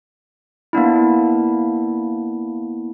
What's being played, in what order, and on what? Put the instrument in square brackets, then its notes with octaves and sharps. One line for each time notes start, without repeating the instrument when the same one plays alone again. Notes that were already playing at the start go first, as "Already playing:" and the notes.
[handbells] A#3 B3 D4 E4